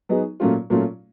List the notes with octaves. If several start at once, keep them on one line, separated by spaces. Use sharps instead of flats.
F#3 B3 D#4 G#4
A#2 F#3 A3 C#4 F4
A#2 F#3 A3 C#4 F4